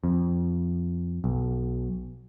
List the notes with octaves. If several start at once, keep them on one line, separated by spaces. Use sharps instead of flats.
F2
B1